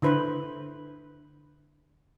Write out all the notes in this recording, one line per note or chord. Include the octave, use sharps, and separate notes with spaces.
D3 E4 B4 C5